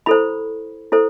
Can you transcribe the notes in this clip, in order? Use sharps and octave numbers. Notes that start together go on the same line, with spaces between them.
E4 A4 C5 B5
E4 A4 C5